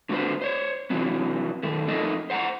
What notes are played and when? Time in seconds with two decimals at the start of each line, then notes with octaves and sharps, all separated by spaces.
0.09 D3 A3 F#4 B4 C5
0.42 C5 C#5
0.90 C3 E3 F#3 G#3 B3
1.63 F#2 D#3 A3
1.88 F2 A3 D#4 A4 A#4 D#5
2.30 C5 F#5 G5 A#5